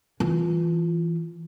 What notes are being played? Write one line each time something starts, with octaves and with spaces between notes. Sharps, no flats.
E3 F4